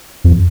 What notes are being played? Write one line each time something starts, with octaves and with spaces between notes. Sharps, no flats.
F2